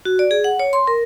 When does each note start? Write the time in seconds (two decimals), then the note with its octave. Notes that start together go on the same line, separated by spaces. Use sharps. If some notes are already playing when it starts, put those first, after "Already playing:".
0.05 F#4
0.19 D5
0.31 G#4
0.44 F#5
0.59 C#5
0.73 C6
0.87 A#4